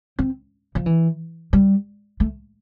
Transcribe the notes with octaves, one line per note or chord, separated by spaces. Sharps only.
C4
F3
E3
G3
A3